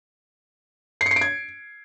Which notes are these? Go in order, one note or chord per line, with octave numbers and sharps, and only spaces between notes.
C7
C#7
C7
D7
G#6